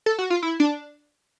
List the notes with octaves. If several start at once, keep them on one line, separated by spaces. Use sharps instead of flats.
A4
F#4
F4
E4
D4